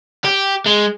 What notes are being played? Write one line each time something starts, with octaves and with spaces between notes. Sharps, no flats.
G4
G#3